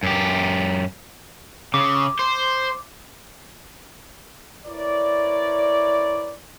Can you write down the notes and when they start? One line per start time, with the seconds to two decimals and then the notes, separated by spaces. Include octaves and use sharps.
0.03 F#2 G4
1.74 C#3 D6
2.19 C5
4.66 E4 A#4 B4 C#5 D5